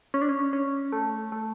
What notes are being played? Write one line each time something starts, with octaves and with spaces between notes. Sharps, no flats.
C#4
D4
C#4
C#4
A3
A3